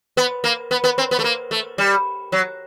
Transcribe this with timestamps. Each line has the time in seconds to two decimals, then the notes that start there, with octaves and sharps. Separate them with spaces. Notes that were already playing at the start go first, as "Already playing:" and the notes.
0.17 B3
0.44 A#3
0.71 B3
0.84 B3
0.98 C4
1.11 B3
1.19 A3
1.24 A#3
1.51 A3
1.78 G3
2.32 F#3